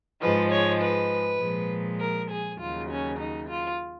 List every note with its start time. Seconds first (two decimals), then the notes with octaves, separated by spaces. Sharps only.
0.21 G#2 F3 G#3 B4
0.50 C#5
0.81 B4
1.40 A#2 F3 G#3
1.99 A#4
2.30 G#4
2.59 D#2 C#3 F#3 F4
2.89 C#4
3.18 D#4
3.48 F4